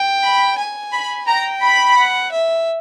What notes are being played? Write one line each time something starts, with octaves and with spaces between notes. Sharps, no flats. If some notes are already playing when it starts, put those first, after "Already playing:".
Already playing: G5
B5
G#5
B5
G5 A#5
B5
F#5
E5